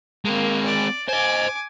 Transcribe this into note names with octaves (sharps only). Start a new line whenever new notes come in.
G#3 A#3 C4
D5
C5 D#5 G#5 D6